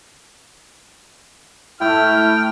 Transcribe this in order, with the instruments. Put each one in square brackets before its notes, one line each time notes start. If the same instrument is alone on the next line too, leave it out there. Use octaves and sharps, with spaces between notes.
[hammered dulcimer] A2 A3 [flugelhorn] E4 [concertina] G5 [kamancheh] F6